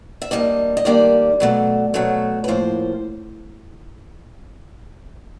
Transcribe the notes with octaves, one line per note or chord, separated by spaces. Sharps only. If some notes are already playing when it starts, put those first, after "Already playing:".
E5
G2 D#3 G3 A#3 D#5
D#5
G2 D#3 G3 A#3 D5
B2 F#3 A3
B2 F#3 A3 C#5
B4
A2 F3 A#3 C5